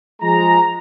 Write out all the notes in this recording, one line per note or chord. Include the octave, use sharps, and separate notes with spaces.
F3 G#3 A#5